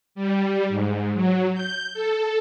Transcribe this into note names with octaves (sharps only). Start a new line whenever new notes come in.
G3
G#2
F#3
G6
A4